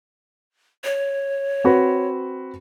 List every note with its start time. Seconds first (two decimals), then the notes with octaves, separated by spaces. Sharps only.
0.84 C#5
1.64 C4 F#4 B4